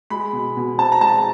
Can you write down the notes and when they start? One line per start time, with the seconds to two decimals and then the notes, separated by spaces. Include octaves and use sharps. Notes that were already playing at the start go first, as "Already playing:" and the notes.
0.10 G#3 B5
0.33 B2
0.57 B2
0.78 C4 A5
0.92 A#5
1.01 G#3 A5